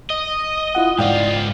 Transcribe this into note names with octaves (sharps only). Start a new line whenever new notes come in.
D#5
E4 F4 F#5
G#2 F4 D5 F5 G5